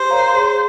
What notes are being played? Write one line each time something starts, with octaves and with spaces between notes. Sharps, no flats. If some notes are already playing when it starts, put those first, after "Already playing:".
Already playing: G4 C5
A#4 C#5 F5 A#5
G#4